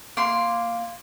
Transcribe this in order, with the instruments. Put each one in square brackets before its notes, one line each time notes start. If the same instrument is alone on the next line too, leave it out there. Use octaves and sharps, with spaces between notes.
[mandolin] A#3 C6